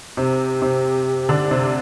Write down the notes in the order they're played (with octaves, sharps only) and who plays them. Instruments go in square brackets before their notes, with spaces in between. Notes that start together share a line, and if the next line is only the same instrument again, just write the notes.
[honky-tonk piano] C3 C4 [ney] G4
[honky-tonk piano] C3 C4
D3 D4
C3 C4